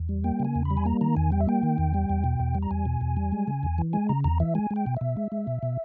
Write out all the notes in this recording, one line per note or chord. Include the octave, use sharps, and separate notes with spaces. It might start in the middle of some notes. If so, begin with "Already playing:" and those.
Already playing: E2
G3
A#3 G5
C#3
G#5
E2
B5
G3
G#5
A#3 A#5
D#3 A#5
E2 G#5
G3 G5
E5
A#3 G5
D#3
E2
G3
E2
B2
E2
G3
A#5
E2 G#5
B2
E2
G3
G#3
C#3
E2
E3
G#3 G#5
C#3 A#5
E2 A#5
E3 E5
G#3 G#5
G#3
G5
B2
B2 E5
G#3
G#3
B2
B2